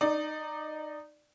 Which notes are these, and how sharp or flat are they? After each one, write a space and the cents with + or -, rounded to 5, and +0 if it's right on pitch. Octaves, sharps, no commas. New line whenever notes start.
D#4 -15 D5 +10